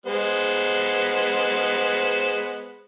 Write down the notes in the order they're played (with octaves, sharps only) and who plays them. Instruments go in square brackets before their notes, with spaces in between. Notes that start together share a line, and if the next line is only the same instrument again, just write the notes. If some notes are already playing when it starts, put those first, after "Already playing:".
[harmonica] G#3 B3 C5